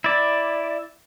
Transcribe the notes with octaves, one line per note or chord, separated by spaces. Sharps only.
E4 D5